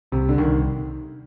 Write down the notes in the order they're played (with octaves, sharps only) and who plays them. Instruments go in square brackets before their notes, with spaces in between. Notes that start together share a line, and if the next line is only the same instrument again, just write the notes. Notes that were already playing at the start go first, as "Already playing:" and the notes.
[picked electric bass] C2 [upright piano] C3
[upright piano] D3
[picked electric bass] C2 [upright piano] D#3